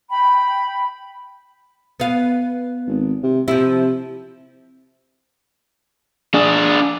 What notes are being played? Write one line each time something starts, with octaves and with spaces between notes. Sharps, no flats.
G5 B5
B3 F5
G#1
C3
C3 F3 E4
D4 G#4